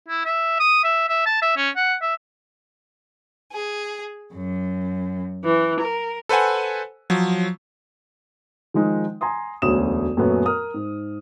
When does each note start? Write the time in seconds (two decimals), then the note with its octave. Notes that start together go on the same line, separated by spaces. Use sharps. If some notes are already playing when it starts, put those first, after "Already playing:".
0.09 E4
0.25 E5
0.60 D#6
0.84 E5
1.09 E5
1.26 A5
1.42 E5
1.57 C#4
1.76 F#5
2.02 E5
3.52 G#4
4.33 F#2
5.44 E3
5.79 A#4
6.29 A4 B4 C5 F#5 G#5
7.10 F3 F#3
8.74 D#3 F3 G#3 D#4
9.21 G#5 A#5 C6 D#6
9.62 E1 D2 F#3 C#4 D#6 E7
10.17 F#2 A#2 F#3 A3 B3 C#4
10.45 A#4 D#6 F6
10.74 G#2